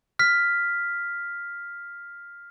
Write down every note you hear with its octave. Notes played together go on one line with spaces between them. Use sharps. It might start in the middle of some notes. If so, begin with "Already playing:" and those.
F6 B6